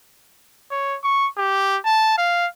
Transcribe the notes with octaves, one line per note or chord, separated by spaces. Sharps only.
C#5
C#6
G4
A5
F5